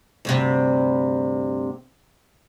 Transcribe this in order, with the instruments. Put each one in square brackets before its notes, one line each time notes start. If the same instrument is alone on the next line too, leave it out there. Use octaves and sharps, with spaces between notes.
[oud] D2 G2 C3